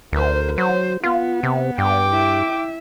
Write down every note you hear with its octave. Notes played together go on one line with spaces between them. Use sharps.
D2 A#4 C5
F#3 C5
B3 F4
C3
G2 G5 D6
E4 E5